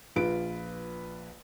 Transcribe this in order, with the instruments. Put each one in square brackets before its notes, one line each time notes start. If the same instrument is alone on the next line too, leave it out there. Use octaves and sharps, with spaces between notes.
[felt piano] A#1 F4 B4 D7